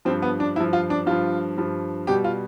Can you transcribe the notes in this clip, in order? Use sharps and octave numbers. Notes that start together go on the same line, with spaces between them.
G2 F3 C4
B3
D4
G2 F3 E4
F4
D4
G2 F3 F4
G2 F3
B2 G3 G4
F4